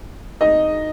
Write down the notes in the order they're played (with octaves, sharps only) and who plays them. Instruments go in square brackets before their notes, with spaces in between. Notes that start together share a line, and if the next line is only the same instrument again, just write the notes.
[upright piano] D#4 D#5